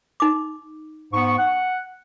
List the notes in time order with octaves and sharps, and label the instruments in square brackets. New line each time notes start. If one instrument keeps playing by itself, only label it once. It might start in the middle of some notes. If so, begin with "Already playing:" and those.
[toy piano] D#4 D6
[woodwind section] G#2 B3 C#6
F#5